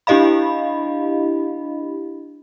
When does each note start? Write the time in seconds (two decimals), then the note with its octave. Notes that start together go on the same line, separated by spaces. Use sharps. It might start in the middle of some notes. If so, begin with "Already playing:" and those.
0.07 D4 E4 G4 D#5 F5 B5